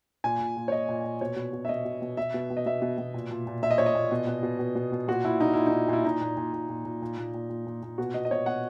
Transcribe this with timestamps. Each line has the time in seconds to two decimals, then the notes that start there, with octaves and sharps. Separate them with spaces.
0.24 A#2 G#5
0.40 A#2
0.57 A#2
0.68 C#5
0.72 A#2 D#5
0.89 A#2
1.04 A#2
1.21 B2 C#5
1.36 B2
1.53 B2
1.65 E5
1.69 B2 D#5
1.85 B2
2.02 B2
2.17 B2 E5
2.34 B2
2.50 B2
2.57 D#5
2.66 B2 E5
2.82 B2
2.98 B2
3.14 A#2
3.31 A#2
3.47 A#2
3.62 A#2 E5
3.71 D#5
3.78 A#2 C#5
3.86 D#5
3.95 A#2
4.12 B2
4.27 B2
4.43 B2
4.59 B2
4.75 B2
4.92 B2
5.08 A#2 F#4
5.24 A#2 E4
5.40 A#2 D#4
5.54 A#2 E4
5.66 D#4
5.72 A#2
5.88 A#2 E4
6.05 A#2 D#4
6.21 A#2
6.37 A#2
6.53 A#2
6.69 A#2
6.85 A#2
7.02 A#2
7.18 A#2
7.34 A#2
7.49 A#2
7.67 A#2
7.83 A#2
7.98 B2 F#4
8.14 B2 D#5
8.25 D#5
8.31 B2 C#5
8.46 B2 F#5